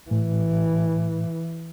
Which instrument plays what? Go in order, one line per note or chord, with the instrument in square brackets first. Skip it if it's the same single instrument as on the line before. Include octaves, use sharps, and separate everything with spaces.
[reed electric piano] A2 [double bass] E3